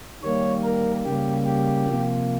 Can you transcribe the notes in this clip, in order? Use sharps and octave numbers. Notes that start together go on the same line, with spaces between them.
D#3 G3 A#3 C#5
A#4
C#3 G3 A#3 G4
G4
C3 F3 A#3